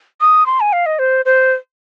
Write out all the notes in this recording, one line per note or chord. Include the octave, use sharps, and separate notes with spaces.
D#6
C6
G#5
F5
D#5
C5
C5